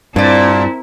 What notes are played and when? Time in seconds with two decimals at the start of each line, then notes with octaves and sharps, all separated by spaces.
0.16 G2 A#2 C4 D4 E4 D5